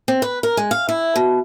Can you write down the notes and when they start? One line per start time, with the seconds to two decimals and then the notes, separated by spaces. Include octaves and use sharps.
0.08 C4
0.22 B4
0.43 A#4
0.57 G#3
0.71 F5
0.89 E4
1.16 B2